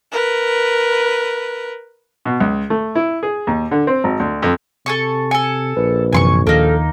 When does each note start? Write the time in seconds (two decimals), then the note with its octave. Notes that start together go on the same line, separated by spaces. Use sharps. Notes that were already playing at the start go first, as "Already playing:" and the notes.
0.12 A#4 B4
2.25 B2
2.40 C#2
2.70 A3
2.95 E4
3.23 G#4
3.47 D#2
3.71 D3
3.87 C4
4.04 G#1
4.20 D2
4.42 F2
4.86 C3 A4 G#5 C#6
5.31 A4 G#5 C#7
5.77 A#1 B4
6.13 F#2 C3 E3 G#5 C6 C#6
6.47 D#2 D#3 A#3 D#4 A4 F6